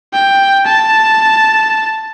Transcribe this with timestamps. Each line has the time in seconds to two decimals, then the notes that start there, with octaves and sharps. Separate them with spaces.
0.14 G5
0.66 A5